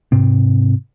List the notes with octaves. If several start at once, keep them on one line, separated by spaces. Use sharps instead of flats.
G#2 C3 C4